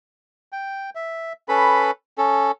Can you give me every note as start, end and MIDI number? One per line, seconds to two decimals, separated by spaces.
0.52 0.90 79
0.95 1.33 76
1.49 1.91 61
1.49 1.91 69
1.49 1.91 71
1.49 1.91 83
2.18 2.51 61
2.18 2.51 69